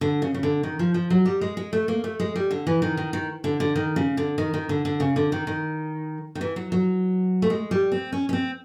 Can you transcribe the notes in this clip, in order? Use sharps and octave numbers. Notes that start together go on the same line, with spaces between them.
D3
C#3
C#3
D3
D#3
F3
F3
F#3
G3
G#3
G#3
A3
A#3
A3
G#3
G3
D3
E3
D#3
D#3
D#3
D3
D3
D#3
C#3
D3
D#3
D#3
D3
D3
C#3
D3
D#3
D#3
D#3
E3
F#3
F#3
A3
G#3
G3
C4
C#4
C#4
C4